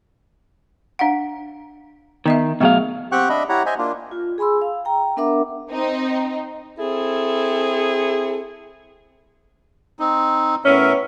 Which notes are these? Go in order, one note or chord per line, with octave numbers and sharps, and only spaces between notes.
D4 F5 F#5
D#3 B3 D#5 E5
B2 F#3 A3 B3 G#4 F5
C4 G4 F#5 G5 C#6 F#6
D4 D#5 E5 B5
E4 G4 C#5 F#5 A#5
C5 D#5 E5 G#5
A#3 D4 F4
F4
G#4 G#5 B5 C6 E6
F5
G5 A#5
B3 D4 A#4 E5 F#5 D6
C4 D#4
C4 E4 G#4 A4
C4 D#4
A2 B3 C#4 A#4 E5